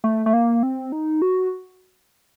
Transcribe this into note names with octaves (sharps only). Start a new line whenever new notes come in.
A3
A3
A#3
C4
D#4
F#4